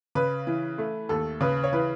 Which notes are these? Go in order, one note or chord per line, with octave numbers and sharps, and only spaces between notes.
C#3 B4
E3
A3
D#2 A4
C#3 B4
C#5
E3 B4